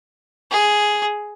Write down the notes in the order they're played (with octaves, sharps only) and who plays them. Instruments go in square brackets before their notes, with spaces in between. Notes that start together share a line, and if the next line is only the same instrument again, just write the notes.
[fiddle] G#4